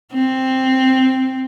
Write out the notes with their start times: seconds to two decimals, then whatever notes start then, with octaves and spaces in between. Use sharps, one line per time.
0.13 C4